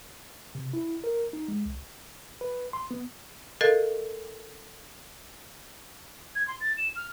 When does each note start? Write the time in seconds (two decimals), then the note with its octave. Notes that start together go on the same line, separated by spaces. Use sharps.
0.55 C3
0.73 E4
1.04 A#4
1.33 D#4
1.48 G#3
1.66 C2
2.41 B4
2.73 C6
2.91 B3
3.61 A4 A#4 D#5 F5 A6
6.35 G#6
6.48 C6
6.60 A6
6.77 E7
6.96 F6